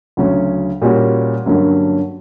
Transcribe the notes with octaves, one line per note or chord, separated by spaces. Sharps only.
D2 C#3 F#3 C#4
A#2 G3 C#4 F#4
G2 D3 F#3 A#3 C#4